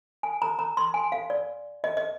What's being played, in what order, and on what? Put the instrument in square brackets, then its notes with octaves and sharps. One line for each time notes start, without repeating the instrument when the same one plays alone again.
[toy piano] G#5
A#5
A#5
C6
G#5
F5
D5
D#5
D#5